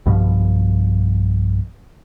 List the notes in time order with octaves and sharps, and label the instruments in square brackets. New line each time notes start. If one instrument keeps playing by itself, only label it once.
[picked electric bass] B1 G2 B2 F3